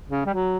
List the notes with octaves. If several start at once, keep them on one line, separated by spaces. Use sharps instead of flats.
C#3
G3
F#3